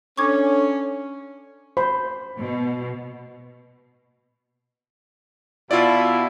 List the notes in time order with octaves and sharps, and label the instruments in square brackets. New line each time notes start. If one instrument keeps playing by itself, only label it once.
[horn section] C#4 [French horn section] D4 A4 [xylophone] C#6 D6 G#6
[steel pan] C5 [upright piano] B5
[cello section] B2
[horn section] B2 E4 [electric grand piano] F4 D5